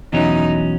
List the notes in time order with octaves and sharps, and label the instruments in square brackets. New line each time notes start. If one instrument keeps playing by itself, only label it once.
[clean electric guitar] E2 B2 F#3 C#4 [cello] D#4